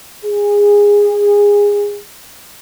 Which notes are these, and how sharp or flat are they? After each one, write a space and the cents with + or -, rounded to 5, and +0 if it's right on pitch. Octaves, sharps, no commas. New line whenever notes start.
G#4 -20